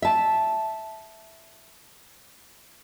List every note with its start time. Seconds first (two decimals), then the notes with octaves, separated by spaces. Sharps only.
0.02 E5 A5